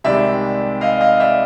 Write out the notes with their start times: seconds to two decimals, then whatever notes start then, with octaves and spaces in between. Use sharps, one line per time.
0.04 C2 C3 D#3 G#3 D5 E5
0.81 D#5 F5
1.01 D#5 F5
1.20 D5 E5